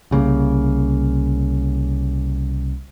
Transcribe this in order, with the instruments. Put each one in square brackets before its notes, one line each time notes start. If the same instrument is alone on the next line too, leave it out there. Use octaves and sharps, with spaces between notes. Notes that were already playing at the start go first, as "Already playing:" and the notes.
[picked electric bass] C2 C#3 A#3